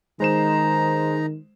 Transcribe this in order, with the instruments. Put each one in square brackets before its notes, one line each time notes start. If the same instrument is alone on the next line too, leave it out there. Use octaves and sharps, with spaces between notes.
[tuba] D#3 [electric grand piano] G#3 C5 E7 [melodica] D#4 A#5